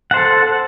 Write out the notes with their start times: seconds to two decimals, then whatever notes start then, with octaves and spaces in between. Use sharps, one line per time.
0.11 F#5
0.14 C5
0.17 A4